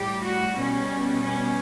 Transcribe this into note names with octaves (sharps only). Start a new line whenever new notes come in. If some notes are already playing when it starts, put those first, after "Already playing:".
Already playing: A2 G3 G4
F#4
B2 G3 C#4
C#4